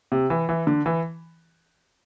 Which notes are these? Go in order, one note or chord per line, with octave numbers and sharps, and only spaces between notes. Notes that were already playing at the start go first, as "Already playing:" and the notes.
C3
E3
E3
D3
E3